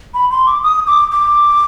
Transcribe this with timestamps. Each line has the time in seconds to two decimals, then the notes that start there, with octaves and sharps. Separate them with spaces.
0.14 B5
0.31 C6
0.46 D6
0.63 D#6
0.87 D6
1.12 D6